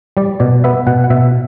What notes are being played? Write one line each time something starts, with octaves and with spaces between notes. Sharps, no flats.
G3 D5
B2 D5
B3 E5
B2 F#5
F#5
B2 E5